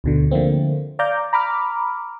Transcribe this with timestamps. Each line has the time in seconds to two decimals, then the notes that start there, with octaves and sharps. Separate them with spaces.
0.04 D2 B2 D3
0.31 D3 F3 A3 A#3 C4
0.99 D5 F5 A#5 D6 G6
1.33 A#5 B5 D6 F6